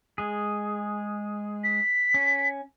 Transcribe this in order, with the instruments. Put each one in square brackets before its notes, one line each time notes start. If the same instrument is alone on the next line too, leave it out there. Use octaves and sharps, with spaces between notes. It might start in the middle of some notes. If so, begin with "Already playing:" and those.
[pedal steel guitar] G#3 G#4
[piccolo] B6
[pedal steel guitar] C#4